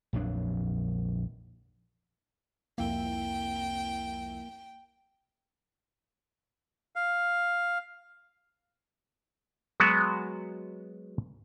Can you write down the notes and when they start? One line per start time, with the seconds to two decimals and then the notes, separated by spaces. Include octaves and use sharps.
0.13 A#1 F2 F#3 D4
2.78 C2 F2 A#3 E4 G5
6.96 F5
9.80 F#3 G#3 B3 F#4